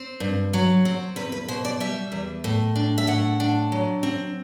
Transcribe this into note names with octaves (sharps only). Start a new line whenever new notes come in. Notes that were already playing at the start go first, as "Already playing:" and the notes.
Already playing: C4 C5
G2
F#3
C4
E2 B4
B4
B2 C5
D5
G3 E5
E2
A2
D4
E5
A2 F#5
D4
F#3
C4